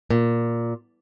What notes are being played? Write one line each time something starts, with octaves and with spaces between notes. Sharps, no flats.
A#2